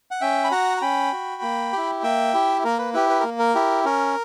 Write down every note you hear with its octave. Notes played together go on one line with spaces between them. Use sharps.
F#5
C#4 E5 G5
B5
F#4 F#5 A#5
A#5
C#4 G5 B5
F#4
A#3
E4 G4
A#3 E5 G5
E4 G4
A#3 A#4
B4
E4 G4 B4
B4
A#3 A#4
A#4
E4 G4
C#4 A#4